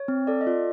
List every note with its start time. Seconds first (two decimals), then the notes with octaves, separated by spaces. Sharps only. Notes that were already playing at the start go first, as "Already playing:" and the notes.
Already playing: C#5
0.08 C4
0.27 A4 D5
0.41 D#5
0.47 F4 D5